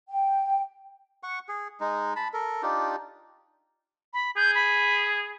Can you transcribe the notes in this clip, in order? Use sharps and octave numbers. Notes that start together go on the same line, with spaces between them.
G5
F#5 C#6
G#4
G#3 D#4
A5 B5
A4 A#4
D4 D#4 F4 G4
B5
G#4 G6
B5